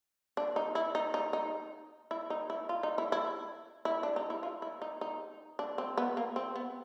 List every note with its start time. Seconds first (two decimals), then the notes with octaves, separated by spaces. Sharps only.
0.37 D4
0.56 D#4
0.75 E4
0.95 D#4
1.14 D#4
1.33 D#4
2.11 E4
2.30 D#4
2.50 E4
2.69 F4
2.83 D#4
2.98 E4
3.12 E4
3.85 E4
4.03 D4
4.16 D#4
4.30 E4
4.43 F4
4.62 E4
4.82 D#4
5.01 D#4
5.59 D4
5.78 C4
5.98 B3
6.17 A#3
6.36 C4
6.56 B3